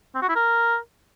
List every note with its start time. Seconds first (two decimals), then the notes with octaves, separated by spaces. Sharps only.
0.15 C4
0.22 F#4
0.29 E4
0.36 A#4